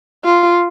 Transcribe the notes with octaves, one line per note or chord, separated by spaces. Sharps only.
F4